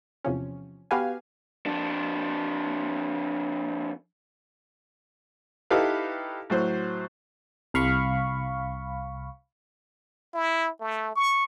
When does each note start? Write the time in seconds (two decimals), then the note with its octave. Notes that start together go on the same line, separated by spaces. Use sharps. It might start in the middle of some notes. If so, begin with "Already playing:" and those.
0.24 E2 C3 F3 C#4
0.91 B3 F#4 G4 B4 F5 G#5
1.66 F2 D4
5.70 D#4 E4 G4 A4 B4 F5
6.50 A2 F#3 C5
7.74 C2 F5 B5 C#6
10.34 E4
10.80 A3
11.16 C#6